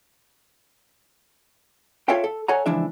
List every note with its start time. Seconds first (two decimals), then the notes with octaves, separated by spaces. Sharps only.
2.08 F4 A4 C#5 E5 F5 G5
2.24 A4
2.48 A4 C#5 F#5 G#5 A#5
2.66 C#2 E3 F3 D4 E5